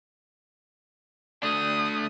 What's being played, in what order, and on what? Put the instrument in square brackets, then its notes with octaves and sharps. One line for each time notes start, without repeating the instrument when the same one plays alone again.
[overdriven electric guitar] A3 D4 [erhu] D#6